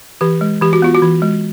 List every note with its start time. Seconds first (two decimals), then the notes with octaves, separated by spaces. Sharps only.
0.21 E3 G4
0.41 G#3
0.61 E3 G4
0.73 F#4
0.82 B3 F4
0.95 F#4
1.02 E3
1.22 G#3